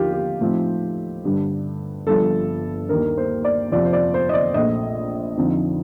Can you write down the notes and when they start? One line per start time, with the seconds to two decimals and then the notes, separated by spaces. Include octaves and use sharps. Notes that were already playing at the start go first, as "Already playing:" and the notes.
Already playing: D#2 D3 F3 A#3 D#4 F4 G4
0.13 G4
0.41 A2 F3 C4 D#4
1.24 G2 D3 G3
2.07 G1 G2 F3 A4
2.89 D#2 D#3 A#3 D4 A#4
3.17 C5
3.44 D5
3.72 F2 C3 F3 D5
3.85 C5
3.93 D5
4.14 C5
4.29 D#5
4.34 D5
4.54 A#1 A#2 A3 D#5
5.37 F2 D3 F3 C4 D#4